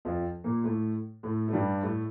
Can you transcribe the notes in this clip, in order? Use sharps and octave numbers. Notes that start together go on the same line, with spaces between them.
F2 F3
A#2 A#3
A2 A3
A2 A3
A3
G2 G3
A2 A3